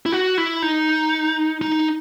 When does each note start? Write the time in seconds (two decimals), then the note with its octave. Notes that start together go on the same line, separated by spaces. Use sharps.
0.06 E4
0.12 F#4
0.38 E4
0.62 D#4
1.61 D#4